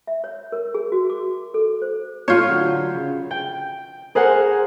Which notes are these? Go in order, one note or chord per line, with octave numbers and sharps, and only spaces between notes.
E5
C#5
A#4
G#4
F#4
D6
A4
C5
A2 F4 C#5 G6
D3 F#3
C#3
G5
G#4 A#4 C5 F#5 G#5